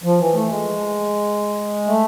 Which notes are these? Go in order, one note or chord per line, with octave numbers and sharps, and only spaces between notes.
F3
E3
A3
G#3
A3